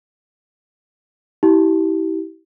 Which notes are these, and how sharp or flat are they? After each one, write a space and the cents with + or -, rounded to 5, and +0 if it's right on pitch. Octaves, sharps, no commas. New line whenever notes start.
E4 -30 G4 -20